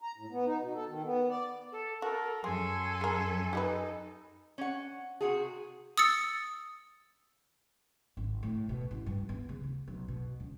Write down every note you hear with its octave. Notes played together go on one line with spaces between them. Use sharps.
A#5
A2
B3
D#4
B2
A4
D#3
B3
D5
A4
F#4 A4 A#4
F#2 G#4 A4 G#5 C6
G#4 A#4
D#4 G4 G#4 B4
C#4 F#5
C3 F#4 G#4
D#6 E6 A6 C#7
G#1
A2
B2
A1
G2
B3
C#3
D2
B1
B2
C#2